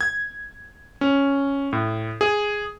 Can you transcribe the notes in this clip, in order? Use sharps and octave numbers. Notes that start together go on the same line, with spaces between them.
G#6
C#4
A2
G#4